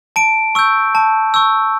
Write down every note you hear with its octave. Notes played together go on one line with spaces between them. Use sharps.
A5 D7
C#6 E6 G6
A5
C#6 E6 G6